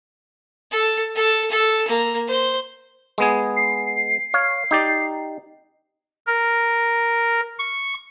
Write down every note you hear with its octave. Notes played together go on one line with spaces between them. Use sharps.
A4
A4
A4
A#3
C5
G#3 B3 G#4
C7
C#5 F5
D#4 G4 D5
A#4
C#6